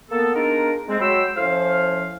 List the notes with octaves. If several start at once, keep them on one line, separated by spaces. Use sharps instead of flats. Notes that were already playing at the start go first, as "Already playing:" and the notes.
A#3 B3 A4
G#3 B3 D4 D#4 F4 A#4
G#3 C4
F#3 G#3 G5 B5 C6 E6
A2 F3 C#4 C5 F5